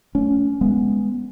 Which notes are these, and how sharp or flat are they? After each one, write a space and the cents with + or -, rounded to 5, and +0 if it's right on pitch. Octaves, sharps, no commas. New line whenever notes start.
A3 +0 C#4 +25
G#3 +0 B3 +0